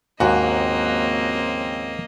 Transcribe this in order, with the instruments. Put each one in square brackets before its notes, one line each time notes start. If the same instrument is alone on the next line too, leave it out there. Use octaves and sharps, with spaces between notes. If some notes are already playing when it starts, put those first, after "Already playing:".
[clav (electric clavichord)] D#2 G#2 [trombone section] C#3 F3 C4 [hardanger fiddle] A#3 D#5 [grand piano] F#4